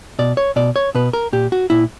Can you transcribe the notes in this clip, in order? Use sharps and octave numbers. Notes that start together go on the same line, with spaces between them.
B2 D5
C#5
B2 D5
C#5
B2 B4
A#4
A#2 G4
F#4
A#2 E4